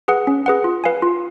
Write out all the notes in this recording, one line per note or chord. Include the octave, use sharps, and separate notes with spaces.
G#4 B4 F#5
C#4
G#4 B4 F#5
F4
B4 F5 G#5
F4